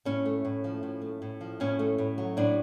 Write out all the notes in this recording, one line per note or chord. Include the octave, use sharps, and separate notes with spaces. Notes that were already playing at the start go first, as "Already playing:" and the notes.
A2 C#4
A3
A2
F3
A2
A3
A2
F3
A2 C#4
A3
A2
F#3
A2 D4